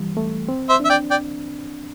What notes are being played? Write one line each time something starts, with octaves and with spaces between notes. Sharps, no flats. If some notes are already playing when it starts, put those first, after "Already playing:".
Already playing: E3 G3
A3
C4
C5 E5
D4
E5
D5 G5
D5 G5